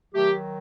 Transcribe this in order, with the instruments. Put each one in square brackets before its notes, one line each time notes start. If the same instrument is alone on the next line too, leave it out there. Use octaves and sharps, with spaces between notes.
[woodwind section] D#3 F#3 A3 G4